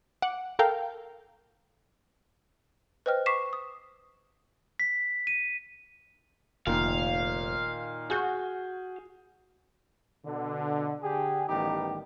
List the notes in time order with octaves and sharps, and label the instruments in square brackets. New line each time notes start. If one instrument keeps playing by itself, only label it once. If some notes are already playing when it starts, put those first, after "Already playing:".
[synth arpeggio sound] F#5 D6
A4 A#4 F5 G5
[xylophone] B4 C5 D#5 G5 F6
C#6 D6 B6 C7 E7
D#6
[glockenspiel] B6
D#7
[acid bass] F1 [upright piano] A#2 D#3 [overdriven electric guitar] F5
[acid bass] F#4 [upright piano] G#4 G6
[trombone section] B2 D3
D3 G4 G#4
A1 D#3 G3 B3 D#4 G4